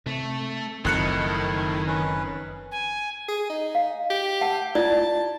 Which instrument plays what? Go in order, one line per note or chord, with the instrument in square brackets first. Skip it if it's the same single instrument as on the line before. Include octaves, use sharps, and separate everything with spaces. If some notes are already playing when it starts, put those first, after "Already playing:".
[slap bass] C3 [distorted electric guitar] A3
[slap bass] F#1 [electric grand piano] F2 F#6 C#7 [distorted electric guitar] D#3 [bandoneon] A3 E4
[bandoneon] C#4 B4
[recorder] G#5
[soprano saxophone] G#4
D#4
[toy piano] F5
[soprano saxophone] G4
[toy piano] F#5 A5
[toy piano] E4 F4 D5 [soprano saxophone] A5